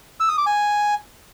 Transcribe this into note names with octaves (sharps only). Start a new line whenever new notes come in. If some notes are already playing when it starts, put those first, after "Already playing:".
E6
D#6
D6
G#5